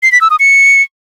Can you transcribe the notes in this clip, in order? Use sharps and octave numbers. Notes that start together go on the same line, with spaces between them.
C7
B6
E6
D#6
C#7